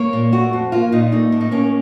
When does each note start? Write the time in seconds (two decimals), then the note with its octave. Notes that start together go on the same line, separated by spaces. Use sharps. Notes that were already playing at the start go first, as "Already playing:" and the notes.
Already playing: A#3 C#5
0.13 A#2
0.32 A3 F#4
0.53 F2
0.72 A#3 F4
0.92 A#2 D#4
1.12 A3 D#4
1.32 A2
1.41 D#4
1.51 A#3 C#4